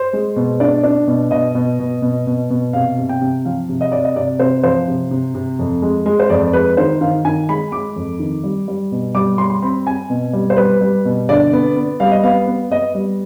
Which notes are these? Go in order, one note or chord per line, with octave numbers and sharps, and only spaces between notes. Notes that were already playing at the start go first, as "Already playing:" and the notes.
Already playing: C5
G#3
B2
D4 D5
D4
B2
B2 D#5
B2
B2
B2
B2
B2
C3 F5
C3
G5
C3
F3 F5
C3
D#5
C3 D5
D#5
C3 D5
C3 C5
F3 C5
C3
C3
C3
F2
G#3
G#3
C5
F2 D5
G#3 B4
D#3 C5
D#3 F5
D#3 G#5
G#3 B5
G#3 D6
F2
D#3
G3
G3
B2
G3 D6
G3 C6
C6
C4 B5
C4 G#5
B2
G3
C5
G3 B4
G3
B2
D3 D5
B3
B3
G3 F5
D#5
B3 F5
B3
B3 D#5
G3